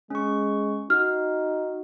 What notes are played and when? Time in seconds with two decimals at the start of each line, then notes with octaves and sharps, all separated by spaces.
0.10 G#3 C#4 C#6
0.90 D#4 F#4 F6